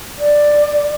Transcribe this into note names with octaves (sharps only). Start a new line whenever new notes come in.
D5